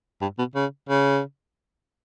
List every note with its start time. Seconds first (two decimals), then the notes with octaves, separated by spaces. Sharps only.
0.21 G2
0.38 B2
0.55 C#3
0.89 C#3